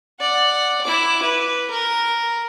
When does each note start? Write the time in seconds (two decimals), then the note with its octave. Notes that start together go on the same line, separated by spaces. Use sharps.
0.20 D5 F#5
0.84 E4 D6
1.23 B4
1.71 A#4